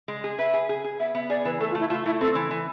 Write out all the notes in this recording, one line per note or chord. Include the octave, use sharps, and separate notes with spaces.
G#3
G#4
B4 E5
G#4
G#4
G#4
B3 E5
B3 E5
G#4 D5
E3 B4
A3 A4
F4
A3
E4
A3 F4
A3 E4
C4 A4
E3
E3